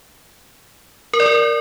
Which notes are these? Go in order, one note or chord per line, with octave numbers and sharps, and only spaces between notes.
A#4
D5
A#4